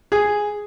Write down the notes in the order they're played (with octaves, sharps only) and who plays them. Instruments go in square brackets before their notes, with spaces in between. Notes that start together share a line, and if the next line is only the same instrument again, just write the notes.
[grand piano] G#4